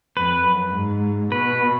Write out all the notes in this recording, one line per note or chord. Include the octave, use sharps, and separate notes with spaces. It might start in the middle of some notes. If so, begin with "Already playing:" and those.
F2 B4
F#2
G#2
B2 B4